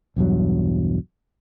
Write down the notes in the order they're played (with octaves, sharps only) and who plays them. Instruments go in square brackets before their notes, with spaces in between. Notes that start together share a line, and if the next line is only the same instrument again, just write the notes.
[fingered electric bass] B1 E2 G2 F#3